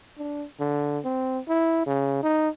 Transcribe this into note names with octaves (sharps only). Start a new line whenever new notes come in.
D4
D3
C4
E4
C#3
D#4